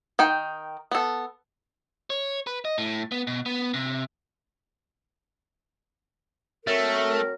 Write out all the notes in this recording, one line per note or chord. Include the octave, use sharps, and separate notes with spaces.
D#3 D#4 G5
B3 A4
C#5
B4
D#5
A2
B3
B2
B3
C3
F#3 A3 C4 A#4